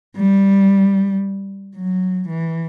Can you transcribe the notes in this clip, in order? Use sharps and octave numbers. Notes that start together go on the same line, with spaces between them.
G3
F#3
E3